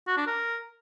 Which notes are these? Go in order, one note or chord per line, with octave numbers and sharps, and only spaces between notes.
F#4
D4
A#4